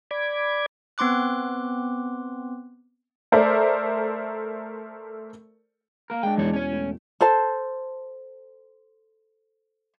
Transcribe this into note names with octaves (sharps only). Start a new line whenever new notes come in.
D5 B5 D6 G#6
B3 C4 C6 D6 F#6
A3 A4 A#4 C5 D5 E5
A#3 A#4
G#3 D4 G5
E1 E2 E4 C#5
C#4 C#5
A2
A4 C5 A5